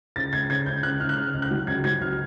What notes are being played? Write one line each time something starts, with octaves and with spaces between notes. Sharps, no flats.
C#2 A6
C#2 G#6
C#3 G#6
C#2 G6
C#2 F#6
C#2 F6
F#6
C#3 F6
C#2
F#6
F#3
C#2 G#6
F#3 G#6
C#2 F6